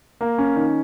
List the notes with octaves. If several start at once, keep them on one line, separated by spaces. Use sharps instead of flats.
A#3
C#4
D#3